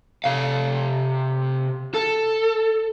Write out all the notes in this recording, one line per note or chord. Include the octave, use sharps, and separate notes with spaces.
C3 F5
A4